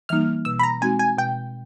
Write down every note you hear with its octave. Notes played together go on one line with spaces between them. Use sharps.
E3 G3 A#3 D#4 F6
B2 E6
B5
A#5
G#3 C4 D#4 F#4 G#5
G#5
B2 G5